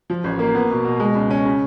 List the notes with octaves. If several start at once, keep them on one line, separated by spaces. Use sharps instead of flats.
F3
A1
A#3
B3
B2
B2
G#3
C#2
C#4
C#3